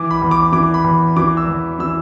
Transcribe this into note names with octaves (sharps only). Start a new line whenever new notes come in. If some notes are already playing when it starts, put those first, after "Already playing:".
Already playing: E3 D6
B5
E2
D6
E3 D6
B5
E2
E3 D6
E6
E2
E3 E6